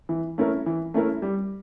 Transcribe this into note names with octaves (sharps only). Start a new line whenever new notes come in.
E3
A3 C#4 E4 A#4
E3
A3 C#4 E4 A#4
G3